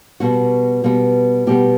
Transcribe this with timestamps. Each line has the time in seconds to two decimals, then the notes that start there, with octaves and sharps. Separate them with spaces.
0.20 B2 G3 B3 F#4
0.84 B2 G3 B3
1.47 B2 G3 B3 G4